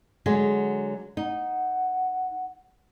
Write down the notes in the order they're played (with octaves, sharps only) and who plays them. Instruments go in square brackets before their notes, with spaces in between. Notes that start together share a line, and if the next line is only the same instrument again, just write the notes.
[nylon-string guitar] D3 F#3 G#3
[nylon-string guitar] D#4 [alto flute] F#5